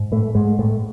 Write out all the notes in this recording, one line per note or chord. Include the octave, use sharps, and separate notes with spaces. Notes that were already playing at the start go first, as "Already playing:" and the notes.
Already playing: G#2
A2 A3
G#2 G#3
A2 A3